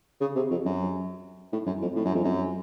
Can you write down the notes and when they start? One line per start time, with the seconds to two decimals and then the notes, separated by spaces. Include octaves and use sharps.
0.21 C#3
0.35 C3
0.50 F2
0.65 F#2
1.52 A2
1.66 F#2
1.81 F2
1.95 A2
2.05 F#2
2.15 F2
2.24 F#2